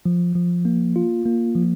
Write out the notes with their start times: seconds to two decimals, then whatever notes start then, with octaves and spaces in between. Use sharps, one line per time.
0.06 F3
0.35 F3
0.65 A#3
0.96 F4
1.26 A#3
1.55 F3